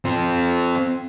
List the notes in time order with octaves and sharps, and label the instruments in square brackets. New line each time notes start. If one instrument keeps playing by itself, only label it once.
[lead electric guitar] C4 F4